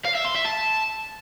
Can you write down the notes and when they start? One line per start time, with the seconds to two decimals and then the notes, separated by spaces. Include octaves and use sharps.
0.05 F5
0.15 E5
0.25 C6
0.35 E5
0.45 A5